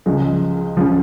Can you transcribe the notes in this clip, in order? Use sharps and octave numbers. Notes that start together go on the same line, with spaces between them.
C#2 C#3 F3 G#3
C#2 C#3 F3